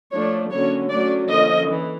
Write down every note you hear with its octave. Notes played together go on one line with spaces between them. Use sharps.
F3 A3 D4 C#5
D3 F#3 A#3 C#4 C#5
F#3 A3 C#4 D5
D3 F3 A#3 C#4 D#5
E3